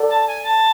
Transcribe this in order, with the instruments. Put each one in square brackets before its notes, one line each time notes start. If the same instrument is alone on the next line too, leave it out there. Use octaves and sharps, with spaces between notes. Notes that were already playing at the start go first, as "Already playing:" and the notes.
Already playing: [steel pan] A4 D5 F#5
[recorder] A5
G#5
A5